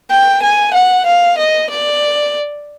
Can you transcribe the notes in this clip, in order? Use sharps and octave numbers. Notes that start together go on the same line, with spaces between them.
G5
G#5
F#5
F5
D#5
D5